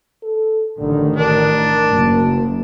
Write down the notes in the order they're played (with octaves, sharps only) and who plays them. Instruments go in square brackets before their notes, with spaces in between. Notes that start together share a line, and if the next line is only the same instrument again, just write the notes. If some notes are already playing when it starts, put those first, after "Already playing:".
[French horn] A4
[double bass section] A1 D#3 [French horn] D3
[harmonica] D4 [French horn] A#4
[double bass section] F#1